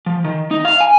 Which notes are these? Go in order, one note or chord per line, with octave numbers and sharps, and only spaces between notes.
F3
D#3
D#4
F5
G#5